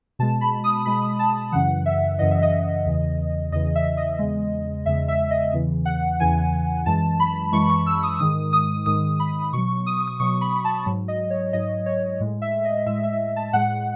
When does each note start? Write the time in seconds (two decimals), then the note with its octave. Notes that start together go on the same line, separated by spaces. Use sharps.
0.19 B2 G#3 A5
0.41 B5
0.64 D#6
0.85 B2 G#3 B5
1.19 A5
1.52 F#2 C#3 E3 F#5
1.86 E5
2.19 F#2 C#3 E3 D#5
2.31 E5
2.43 D#5
2.86 E2 C#3 E3
3.52 E2 C#3 E3 D#5
3.75 E5
3.97 D#5
4.19 E2 C#3 G#3
4.86 E2 C#3 G#3 E5
5.08 E5
5.31 D#5
5.53 E2 C#3 E3
5.85 F#5
6.20 E2 C#3 E3 G#5
6.86 F#2 E3 G#3 A5
7.20 B5
7.52 F#2 E3 G#3 C#6
7.70 C#6
7.86 E6
8.03 D#6
8.19 G#2 D#3 G#3 D#6
8.53 D#6
8.86 G#2 D#3 G#3 D#6
9.20 B5
9.53 B2 F#3 C#6
9.86 D#6
10.08 D#6
10.20 B2 F#3 C#6
10.41 B5
10.65 A5
10.86 G#2 F#3
11.08 D#5
11.30 C#5
11.53 G#2 F#3 D#5
11.86 C#5
12.20 A2 G#3
12.42 E5
12.65 D#5
12.86 A2 G#3 E5
13.03 E5
13.36 A5
13.53 A2 G#3 F#5